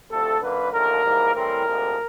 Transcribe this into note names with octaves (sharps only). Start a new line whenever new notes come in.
D2 C3 F3 A3 A4
F#2 D3 F#3 A#3 B4
D#2 D3 F3 A3 A#4
G#2 E3 G3 A#3
A2 E3 G3 C4 A#4
D2 C3 F3 G#3